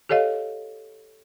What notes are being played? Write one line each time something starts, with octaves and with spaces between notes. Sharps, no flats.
G4 A4 C#5 D#5 F5